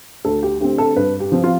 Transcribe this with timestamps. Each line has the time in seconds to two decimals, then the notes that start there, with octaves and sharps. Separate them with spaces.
0.25 D2 A4
0.43 G4
0.60 D3 A3 C4 G4
0.78 A4
0.96 G2 B4
1.20 G4
1.32 F3 C4
1.44 F4